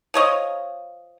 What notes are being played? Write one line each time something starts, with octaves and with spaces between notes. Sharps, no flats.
F3 C#5 D#5